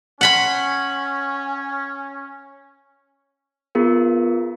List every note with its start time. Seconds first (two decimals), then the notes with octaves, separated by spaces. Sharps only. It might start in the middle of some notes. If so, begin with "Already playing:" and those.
0.21 C#4 F#5 B5 C6
3.75 B3 F4 G#4 A#4